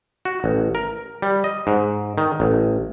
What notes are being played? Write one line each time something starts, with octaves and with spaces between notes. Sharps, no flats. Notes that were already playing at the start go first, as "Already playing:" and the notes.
F#4
A1
A#4
G3
D#5
G#2
D#3
A1